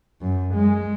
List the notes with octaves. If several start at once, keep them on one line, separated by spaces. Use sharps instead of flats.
F#2
G#3